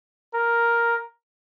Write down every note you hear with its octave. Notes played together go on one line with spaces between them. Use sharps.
A#4